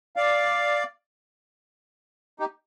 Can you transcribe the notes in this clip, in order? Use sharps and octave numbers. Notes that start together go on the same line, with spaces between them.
D5 F5
D#4 G4